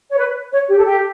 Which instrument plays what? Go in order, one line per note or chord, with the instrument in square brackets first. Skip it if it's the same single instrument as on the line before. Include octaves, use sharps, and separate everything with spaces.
[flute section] C#5
B4
C#5
G4
A4
G4